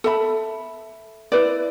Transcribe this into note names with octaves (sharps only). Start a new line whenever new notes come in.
A4 E5 B5
E4 B4 D5